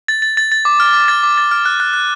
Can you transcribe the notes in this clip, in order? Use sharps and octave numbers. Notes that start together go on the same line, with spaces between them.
A6
A6
A6
A6
D6
F6
D6
A6
D6
A6
F6
F#6
F#6
F#6